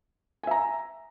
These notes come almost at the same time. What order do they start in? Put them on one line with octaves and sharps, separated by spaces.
G#5 E5 A#5